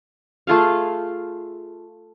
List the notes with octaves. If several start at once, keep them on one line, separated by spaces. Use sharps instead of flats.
A3 F4 G#4 F5